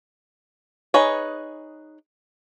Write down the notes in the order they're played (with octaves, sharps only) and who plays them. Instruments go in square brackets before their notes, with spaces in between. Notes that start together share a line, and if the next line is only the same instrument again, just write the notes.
[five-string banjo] D#4 G#4 B4 C#5